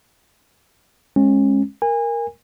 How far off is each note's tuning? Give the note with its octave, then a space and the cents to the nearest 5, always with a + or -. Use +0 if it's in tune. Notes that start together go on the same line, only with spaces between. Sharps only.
G#3 +0 C#4 -30
A#4 +0 G#5 -30